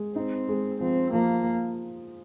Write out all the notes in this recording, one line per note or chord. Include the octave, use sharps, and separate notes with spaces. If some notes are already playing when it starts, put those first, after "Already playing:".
Already playing: G#3
C4 D#4
G#3
F3 C4
F3 A#3